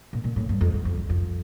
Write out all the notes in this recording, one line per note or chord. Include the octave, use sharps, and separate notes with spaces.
A#2
A#2
A2
G2
F2
E2
F2
E2
F2